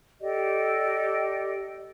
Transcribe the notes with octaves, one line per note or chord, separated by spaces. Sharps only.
G4 A4 D5 D#5